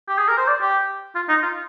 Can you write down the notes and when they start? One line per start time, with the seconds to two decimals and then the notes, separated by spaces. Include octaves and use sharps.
0.09 G4
0.18 G#4
0.28 A#4
0.38 C5
0.48 D5
0.62 G4
1.15 F4
1.29 D#4
1.43 F4